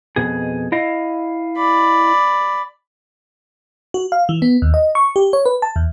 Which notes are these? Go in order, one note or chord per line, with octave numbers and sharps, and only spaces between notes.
F2 B2 G#4
E4 D#5 F5
D5 B5
F#4
F5
E3
B3
D#2
D#5
C#6
G4
C#5
B4
A5
E2